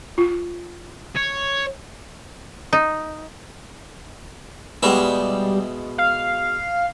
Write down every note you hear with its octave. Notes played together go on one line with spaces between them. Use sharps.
F4
C#5
D#4
B2 G3 G#3 E4
F5